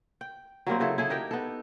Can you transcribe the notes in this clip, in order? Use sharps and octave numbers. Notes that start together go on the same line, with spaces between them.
G5
F#3 G3 A#3 C4
C#3 F#3 E4 A4
E4 G#4 A4
D#4 G4 A#4 G5
B3 A4